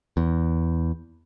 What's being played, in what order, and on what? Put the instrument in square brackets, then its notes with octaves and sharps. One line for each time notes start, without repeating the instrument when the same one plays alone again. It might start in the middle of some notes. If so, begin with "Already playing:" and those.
[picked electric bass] E2